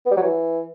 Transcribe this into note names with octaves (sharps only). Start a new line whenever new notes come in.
B3
G3
F#3
E3